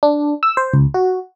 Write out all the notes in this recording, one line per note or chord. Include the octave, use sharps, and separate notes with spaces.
D4
E6
C5
C#2
F#4